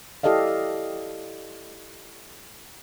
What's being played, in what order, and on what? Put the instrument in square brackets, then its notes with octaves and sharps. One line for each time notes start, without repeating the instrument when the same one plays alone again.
[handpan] E4 G4 A4 D5 D#5 F5